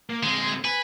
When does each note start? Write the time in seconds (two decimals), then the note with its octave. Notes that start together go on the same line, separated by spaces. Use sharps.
0.10 A#3
0.23 D3 G#3 C4
0.65 B4 G#5